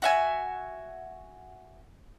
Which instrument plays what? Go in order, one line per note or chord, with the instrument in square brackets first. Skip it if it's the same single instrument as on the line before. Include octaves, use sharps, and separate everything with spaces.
[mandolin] F#4 E5 G#5